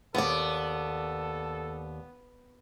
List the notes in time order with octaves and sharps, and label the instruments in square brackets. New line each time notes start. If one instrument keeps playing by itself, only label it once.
[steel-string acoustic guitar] D#2 D5 [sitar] B3 [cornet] A4